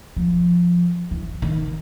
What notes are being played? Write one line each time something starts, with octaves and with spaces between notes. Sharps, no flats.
F3
E3
D#3